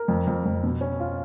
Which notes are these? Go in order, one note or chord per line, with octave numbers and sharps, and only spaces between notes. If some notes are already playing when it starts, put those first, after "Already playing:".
Already playing: A#4
F2
F2
F2
B2
C#4
F4